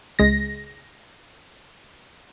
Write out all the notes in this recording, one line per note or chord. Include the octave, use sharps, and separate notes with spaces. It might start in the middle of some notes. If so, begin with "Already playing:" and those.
C#2 G#3 A#6